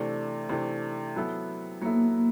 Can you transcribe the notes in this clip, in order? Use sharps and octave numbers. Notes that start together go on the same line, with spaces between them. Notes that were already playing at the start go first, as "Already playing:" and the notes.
Already playing: C3 E3 A3 D4
C3 E3 A3 D4
F#3 B3 E4 A4
F#3 A#3 B3 E4 A4